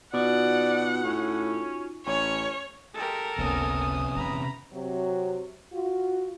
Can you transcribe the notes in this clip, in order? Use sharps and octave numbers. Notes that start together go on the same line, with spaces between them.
B2 D#4 F4 F#4 D5 F#5
A2 C#4
A1 C#4 C#5
G#3 G4 A4 A#4
F#1 C#2 C3 B3 C#4 G#5 D#6
F1 E3 A#5 B5
C3 F#3
F4 F#4